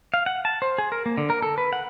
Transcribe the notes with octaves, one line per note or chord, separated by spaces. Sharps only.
F5
F#5
A5
C5
G#4
A#4
A#3
D3
A#4
A4
B4
F#5